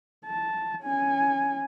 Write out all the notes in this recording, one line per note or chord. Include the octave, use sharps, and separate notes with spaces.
A5
C#4 G#5